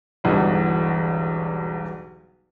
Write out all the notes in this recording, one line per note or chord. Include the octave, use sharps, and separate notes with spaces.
E1 B1 E2 G2 D3